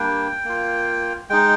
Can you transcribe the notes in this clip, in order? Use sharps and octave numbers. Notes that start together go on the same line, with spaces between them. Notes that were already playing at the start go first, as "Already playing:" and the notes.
Already playing: G3 A#3 D4 G5
A#3 F4
G#3 D#4 G5